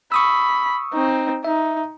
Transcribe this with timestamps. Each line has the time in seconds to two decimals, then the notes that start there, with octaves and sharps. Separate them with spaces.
0.12 B5 C#6 D#6 E6
0.93 C4 D#4
1.45 D#4 E5